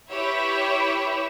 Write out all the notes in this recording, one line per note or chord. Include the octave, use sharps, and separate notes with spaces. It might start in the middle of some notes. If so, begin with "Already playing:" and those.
E4 G4 B4 C#5 E5